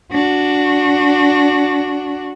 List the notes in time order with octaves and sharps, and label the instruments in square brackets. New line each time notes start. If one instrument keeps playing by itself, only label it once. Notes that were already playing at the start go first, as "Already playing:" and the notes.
[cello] D4 F#4